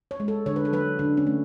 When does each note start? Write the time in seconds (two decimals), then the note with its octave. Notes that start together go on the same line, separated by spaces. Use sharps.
0.11 C#5
0.20 G#3
0.28 A4
0.46 D3 C#5
0.56 B4
0.65 A4
0.73 F#3 B4
0.99 D3 D4
1.17 C#4
1.27 A3